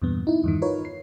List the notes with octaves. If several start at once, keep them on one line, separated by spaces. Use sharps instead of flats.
E2 G2 A#2 B3
D#4 E4
E2 G2 D#3
D#4 F4 A#4 B4 C#5
C7